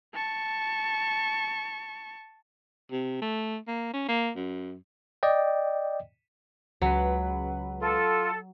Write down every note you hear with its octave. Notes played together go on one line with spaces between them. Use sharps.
A5 C#6
C3
A3
A#3
C#4
A#3
F#2
D5 D#5 G5
C#2 F#3 B4
F4 A4